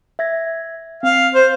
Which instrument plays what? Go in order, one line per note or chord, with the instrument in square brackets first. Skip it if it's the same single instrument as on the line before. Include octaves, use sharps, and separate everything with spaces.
[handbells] E5 G#6 A#6
[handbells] C4 [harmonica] F5
[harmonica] C5